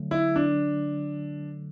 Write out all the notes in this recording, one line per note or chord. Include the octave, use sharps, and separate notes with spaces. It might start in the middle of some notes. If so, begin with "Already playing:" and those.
Already playing: D3 F#3 A3
E4
D4